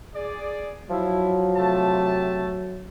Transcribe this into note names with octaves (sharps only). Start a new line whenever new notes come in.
G#4 D5
F3 F#3 E4
C3 A3 A5